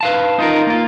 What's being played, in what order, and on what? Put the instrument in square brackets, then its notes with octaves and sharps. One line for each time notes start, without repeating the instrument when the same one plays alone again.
[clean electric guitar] B4 F5 A5
D#4 F4 A#4
A#3 F4